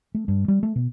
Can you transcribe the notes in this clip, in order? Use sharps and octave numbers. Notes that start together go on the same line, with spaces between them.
A3
G2
G3
A3
B2